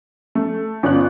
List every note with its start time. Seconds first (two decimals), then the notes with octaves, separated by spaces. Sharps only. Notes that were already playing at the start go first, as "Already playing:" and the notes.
0.35 A3
0.83 G1 C#4 D4 F4 F#6